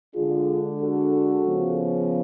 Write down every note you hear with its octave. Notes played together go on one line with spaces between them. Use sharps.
D3 G#3 D4 F4 G#4
F#4 A4
C#3 F3 B3